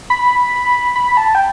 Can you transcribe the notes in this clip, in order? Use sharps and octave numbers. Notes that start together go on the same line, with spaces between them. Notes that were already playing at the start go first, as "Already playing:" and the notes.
B5
B5
A5
G5